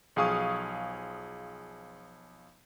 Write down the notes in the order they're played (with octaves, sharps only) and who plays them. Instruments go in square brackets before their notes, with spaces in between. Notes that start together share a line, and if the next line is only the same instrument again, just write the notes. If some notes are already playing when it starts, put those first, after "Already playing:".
[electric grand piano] B1 F3 G#4 F5 C#6 D#6